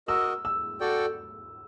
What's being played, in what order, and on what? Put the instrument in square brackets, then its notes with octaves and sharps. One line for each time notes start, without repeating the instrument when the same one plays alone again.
[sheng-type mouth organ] F#4 A#4 D#5 [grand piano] E6
[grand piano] E6
[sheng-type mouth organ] F#4 A4 D5 G5